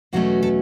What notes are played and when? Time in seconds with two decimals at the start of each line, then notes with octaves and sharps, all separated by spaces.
0.13 E2 B2 F#3 A3 C#4 F#4
0.43 A4